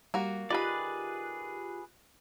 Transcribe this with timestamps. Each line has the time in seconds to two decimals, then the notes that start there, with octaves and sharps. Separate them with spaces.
0.14 G3 A#3 F#4
0.50 D#3 F4 G4 G#4 B4 D5 B5 F#6